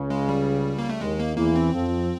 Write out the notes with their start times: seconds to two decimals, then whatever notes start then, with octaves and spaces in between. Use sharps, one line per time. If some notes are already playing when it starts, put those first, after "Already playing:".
Already playing: C#2 C#3
0.10 G#3
0.29 G3
0.78 A#3
0.89 A3
1.01 D#2 D#3 G#3
1.20 A#3
1.37 E2 E3 A#3
1.56 C4
1.74 F2 F3